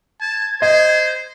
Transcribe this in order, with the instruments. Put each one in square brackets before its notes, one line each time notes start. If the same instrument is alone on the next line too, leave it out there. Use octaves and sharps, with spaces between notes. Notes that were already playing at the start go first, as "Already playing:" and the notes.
[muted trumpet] A5 [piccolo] G#6
[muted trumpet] C5 [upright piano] D#5